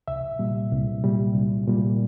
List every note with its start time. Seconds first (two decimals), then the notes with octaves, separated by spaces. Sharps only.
0.08 C2 E5
0.39 A#2 G3
0.72 C2
1.04 A#2 G3
1.35 C2
1.68 A#2 G3